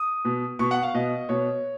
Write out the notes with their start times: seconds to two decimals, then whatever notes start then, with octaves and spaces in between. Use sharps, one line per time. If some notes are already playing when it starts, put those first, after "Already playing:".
Already playing: D#6
0.25 B2
0.59 B2 C#6
0.71 F#5
0.83 F5
0.94 B2 D#5
1.29 B2 C#5